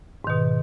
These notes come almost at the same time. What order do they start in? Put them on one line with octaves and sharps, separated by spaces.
G#2 D#3 B2